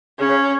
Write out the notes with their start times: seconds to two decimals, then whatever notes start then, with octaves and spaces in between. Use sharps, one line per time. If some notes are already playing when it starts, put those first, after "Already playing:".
0.19 C#3 C#4
0.29 C#3